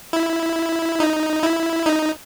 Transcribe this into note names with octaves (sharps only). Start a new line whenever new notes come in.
E4
D#4
E4
D#4